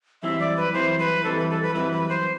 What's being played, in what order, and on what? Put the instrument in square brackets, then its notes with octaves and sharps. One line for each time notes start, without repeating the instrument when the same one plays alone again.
[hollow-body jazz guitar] F#2 E3 G3 C4 E4 [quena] E5
[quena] D5
B4
[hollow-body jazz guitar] F#2 E3 G3 C4 E4 [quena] C5
[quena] B4
[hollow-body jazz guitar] F#2 E3 G3 C4 E4 [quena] A4
[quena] B4
A4
B4
[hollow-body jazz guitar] F#2 E3 G3 C4 E4 [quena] B4
[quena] B4
C5